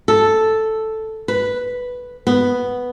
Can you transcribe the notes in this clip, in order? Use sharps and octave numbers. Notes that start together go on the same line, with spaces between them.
A4
B4
B3